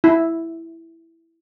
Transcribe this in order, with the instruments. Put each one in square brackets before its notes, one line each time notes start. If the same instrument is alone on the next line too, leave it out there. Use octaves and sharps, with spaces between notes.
[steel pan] E4